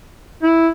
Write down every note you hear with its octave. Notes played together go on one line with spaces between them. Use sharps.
E4